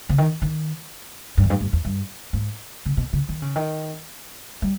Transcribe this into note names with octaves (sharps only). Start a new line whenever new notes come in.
C#3
D#3
D#3
G2
E2
G2
G2
E2
G2
G#2
C#3
B2
C#3
D#3
C#3
D#3
G3